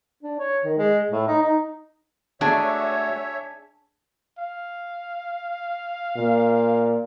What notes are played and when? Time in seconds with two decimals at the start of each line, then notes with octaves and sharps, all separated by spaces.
0.23 D4
0.39 C#5
0.64 D#3
0.78 G#3
1.11 A2
1.28 D#4
1.43 D#4
2.41 A3 D4 F#4 G#4 C#5 E5 G#5 A5
4.38 F5
6.16 A#2